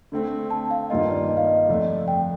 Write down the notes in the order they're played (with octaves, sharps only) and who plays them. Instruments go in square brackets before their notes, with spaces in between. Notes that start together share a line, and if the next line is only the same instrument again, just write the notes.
[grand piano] D3 A3 C4
[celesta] A5
F5
[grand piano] G2 D#3 G3 A#3 F4 [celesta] D#5
[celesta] D5
D#5
F5
D#5
[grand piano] F2 D3 A3 D4
[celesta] G5